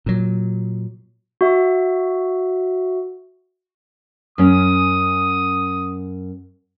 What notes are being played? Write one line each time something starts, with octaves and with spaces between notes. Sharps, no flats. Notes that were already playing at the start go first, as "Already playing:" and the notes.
A#2 F#3
F#4 E5
F#2 C#4 D#6